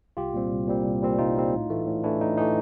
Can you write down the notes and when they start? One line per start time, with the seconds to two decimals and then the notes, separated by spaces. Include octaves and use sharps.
0.17 C2 F4 G4
0.34 A#2 G3 C4
0.52 C2
0.68 A#2 G3 C4
0.85 C2
1.02 A#2 G3 C4
1.19 C2 D#4 F4
1.36 A#2 G3 C4
1.54 A2
1.70 E3 A3
1.87 A2
2.04 E3 A3 D4 E4
2.21 A2 D#4
2.38 E3 A3 D#4